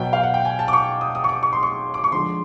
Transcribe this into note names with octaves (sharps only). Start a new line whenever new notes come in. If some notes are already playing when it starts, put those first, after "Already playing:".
Already playing: B2 F#3 B3 G5
F5
F#5
G5
G#5
A5
D6
C#6
D#6
D#6
C#6
D6
C#6
C6
C#6
D6
C#6
D3 F3 G#3 C6